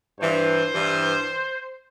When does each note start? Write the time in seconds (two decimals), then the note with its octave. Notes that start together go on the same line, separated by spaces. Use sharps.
0.19 G2 E3 C5
0.73 G2 E3